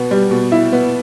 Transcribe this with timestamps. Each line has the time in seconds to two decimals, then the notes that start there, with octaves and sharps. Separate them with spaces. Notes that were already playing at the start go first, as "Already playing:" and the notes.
Already playing: B2 B3
0.11 G3
0.31 B2
0.52 E4
0.72 B3